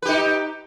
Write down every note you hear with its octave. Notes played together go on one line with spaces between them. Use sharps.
D#4 G4 B4